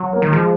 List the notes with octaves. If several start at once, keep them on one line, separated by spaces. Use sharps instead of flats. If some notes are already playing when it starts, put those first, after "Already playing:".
Already playing: F#3
A#3
D#3
F3 G#3